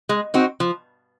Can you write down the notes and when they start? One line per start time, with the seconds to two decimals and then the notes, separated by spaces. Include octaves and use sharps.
0.09 G#3
0.34 C4 D#4 F#4
0.60 F3